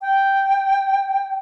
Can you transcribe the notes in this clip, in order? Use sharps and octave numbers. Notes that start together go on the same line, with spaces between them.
G5